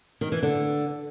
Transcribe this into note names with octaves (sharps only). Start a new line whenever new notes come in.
D#3
E3
D3